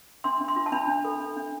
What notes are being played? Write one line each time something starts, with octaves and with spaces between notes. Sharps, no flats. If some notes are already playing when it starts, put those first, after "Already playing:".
D4 C6
D4
C6
F4
A5
D4 B5
D4
A4
D4
D4